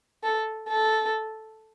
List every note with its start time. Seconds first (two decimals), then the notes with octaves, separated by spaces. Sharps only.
0.24 A4
0.69 A4